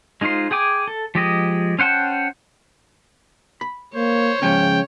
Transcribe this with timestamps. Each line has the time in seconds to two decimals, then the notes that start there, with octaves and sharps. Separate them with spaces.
0.21 G#3 D#4 F4 C5 C6
0.51 G#4 G5 G#5 D6
0.88 A4
1.15 F3 G#3 G4 G#4 D#5
1.79 C#4 C5 F#5 G5 A5
3.61 B5
3.95 A#3 C5 C#5
4.42 C#3 F3 G#3 C#4 G5